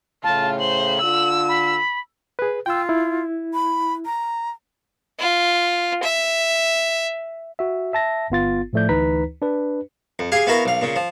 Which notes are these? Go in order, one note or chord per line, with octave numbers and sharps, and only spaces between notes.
A2 C#3 F4 A5
C5 F#7
D3 F4 E6
B5
G#4 B4
F4 G5 E6
E4
B5
A#5
F4
E5
F#4 E5
E5 A5 A#6
G1 B3 F4 A6
A2 F3 A3 D5 G6
D2 E3 D#4 B4 A#5 B6
D4 B4
F2
G4 G#4 F5 G#5
B3 E4 F#4 A#4 F5
B1 F5
A#2 C#3
F3